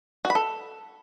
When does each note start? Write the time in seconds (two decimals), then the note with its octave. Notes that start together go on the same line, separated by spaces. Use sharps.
0.25 F#4
0.30 B5
0.35 A4